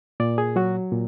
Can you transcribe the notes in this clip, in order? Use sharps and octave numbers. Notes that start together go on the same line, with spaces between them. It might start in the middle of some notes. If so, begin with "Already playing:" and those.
A#2 D5
G#4
F#3 F#4
A#2